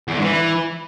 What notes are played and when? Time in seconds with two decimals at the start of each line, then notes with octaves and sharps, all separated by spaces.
0.08 E2
0.13 D3
0.18 G#2
0.24 E3